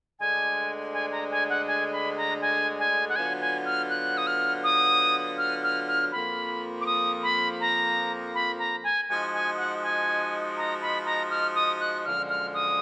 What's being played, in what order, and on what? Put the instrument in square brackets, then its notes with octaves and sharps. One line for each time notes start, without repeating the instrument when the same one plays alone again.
[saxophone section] D2 D3 G#3 D4 [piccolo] G#5
[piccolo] G#5
A#5
G#5
F#5
G#5
B5
A#5
G#5
G#5
F#5
[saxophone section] D3 F#3 B3 F4 [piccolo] G#5
[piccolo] G#5
F6
F#6
D#6
F6
D#6
F6
F6
F6
[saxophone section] F2 F3 A#3 [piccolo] B5
[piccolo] D6
D#6
B5
A#5
B5
A#5
G#5
[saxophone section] F3 G#3 D#4 F#4 [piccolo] G#5
[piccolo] G#5
F#5
G#5
A#5
B5
A#5
F6
D#6
F#6
[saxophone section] F#2 D3 F3 G#3 [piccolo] F6
[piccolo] F6
D#6